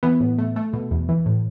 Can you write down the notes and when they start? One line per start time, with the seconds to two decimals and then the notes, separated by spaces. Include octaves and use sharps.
0.03 E3 B3
0.20 A2
0.38 A3
0.56 A3
0.73 B2
0.91 E2
1.09 E3
1.26 A2